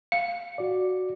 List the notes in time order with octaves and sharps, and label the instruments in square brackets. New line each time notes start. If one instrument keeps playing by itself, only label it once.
[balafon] F5
[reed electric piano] F#4 D5